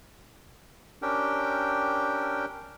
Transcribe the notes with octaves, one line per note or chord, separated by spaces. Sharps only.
C#4 D4 G4 A#4 G5